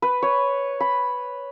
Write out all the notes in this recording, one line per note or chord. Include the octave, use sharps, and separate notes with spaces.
B4
C#5
B5